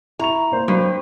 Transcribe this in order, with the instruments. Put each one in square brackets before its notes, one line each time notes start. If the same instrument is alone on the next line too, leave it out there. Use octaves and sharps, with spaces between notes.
[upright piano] E4 C#6 F7 [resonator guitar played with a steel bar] A#5
[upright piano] A#3 C5
[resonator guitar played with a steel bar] G2 [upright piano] F#3 C5